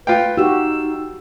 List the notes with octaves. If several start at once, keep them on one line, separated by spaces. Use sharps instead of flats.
F4 B4 F5 G5
D#4 F#4 G4 E6